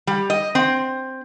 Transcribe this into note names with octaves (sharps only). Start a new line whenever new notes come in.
G3
D#5
C4